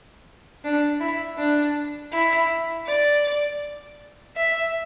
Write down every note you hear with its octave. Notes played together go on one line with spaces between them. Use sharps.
D4
E4
D4
E4
D5
E5